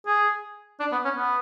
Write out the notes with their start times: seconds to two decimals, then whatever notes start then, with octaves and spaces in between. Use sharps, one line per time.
0.07 G#4
0.80 D4
0.92 B3
1.04 C#4
1.17 B3